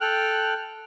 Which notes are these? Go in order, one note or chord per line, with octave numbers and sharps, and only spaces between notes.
A4 G5 F6 F#6